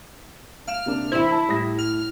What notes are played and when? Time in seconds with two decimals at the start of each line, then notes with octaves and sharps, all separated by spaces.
0.67 F5 F6 D7 E7
0.86 C3 A#3 D4
1.12 E3 E4 C5
1.31 A5
1.49 A2 G3 D#6 A#6
1.79 F6 F7